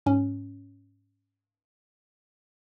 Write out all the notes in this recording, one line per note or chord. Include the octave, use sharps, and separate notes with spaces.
G#2 C#4